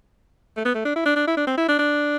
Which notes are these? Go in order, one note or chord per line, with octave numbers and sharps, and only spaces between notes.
A3
B3
A3
D4
E4
D4
D4
E4
D4
C4
E4
D4
D4